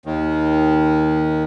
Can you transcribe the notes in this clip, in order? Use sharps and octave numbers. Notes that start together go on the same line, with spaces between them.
D#2 D#3